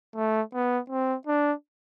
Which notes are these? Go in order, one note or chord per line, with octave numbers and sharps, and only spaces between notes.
A3
B3
C4
D4